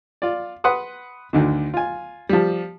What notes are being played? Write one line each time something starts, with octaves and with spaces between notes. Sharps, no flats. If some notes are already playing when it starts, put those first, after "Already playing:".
F4 D5
B4 F#5 C6 D#6
D2 D3 D#3
F4 G#5
F3 G3